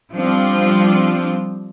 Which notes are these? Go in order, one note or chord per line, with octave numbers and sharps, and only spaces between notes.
F3 G3 C4 D4 F4